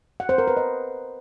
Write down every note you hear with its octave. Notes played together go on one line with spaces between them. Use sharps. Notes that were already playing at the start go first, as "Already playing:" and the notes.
F#5
C5
A#4
B4
D#5